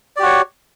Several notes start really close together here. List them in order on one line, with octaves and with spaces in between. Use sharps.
D5 G4 F#4 C#5